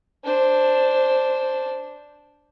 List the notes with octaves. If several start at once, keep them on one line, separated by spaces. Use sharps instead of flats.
D4 C5